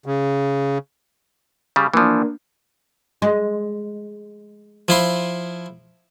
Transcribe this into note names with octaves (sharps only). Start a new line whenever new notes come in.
C#3
C#3 G3
E3 F3 A#3 D4
G#3
F3 E4 C6